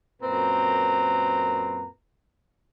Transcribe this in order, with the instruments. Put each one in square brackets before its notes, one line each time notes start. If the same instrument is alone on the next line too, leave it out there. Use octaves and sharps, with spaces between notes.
[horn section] F#2 A#2 C4 B4 A#5